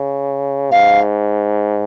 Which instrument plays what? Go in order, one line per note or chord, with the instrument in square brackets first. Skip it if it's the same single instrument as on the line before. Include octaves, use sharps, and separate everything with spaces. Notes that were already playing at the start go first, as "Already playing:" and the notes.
Already playing: [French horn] C#3
[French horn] G#2 [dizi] F5